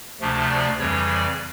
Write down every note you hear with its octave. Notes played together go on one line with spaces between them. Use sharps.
D2 C3 F3 A3 D4
D5
F2 C#3 E3 G3 C#5
D5